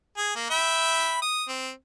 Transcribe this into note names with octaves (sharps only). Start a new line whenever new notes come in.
G#4
A#3
E5 G5 B5
D#6
C4